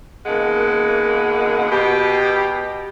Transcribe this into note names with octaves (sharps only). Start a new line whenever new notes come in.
F#2 B2 D#3 G#3 A#3 F#5
B2 G4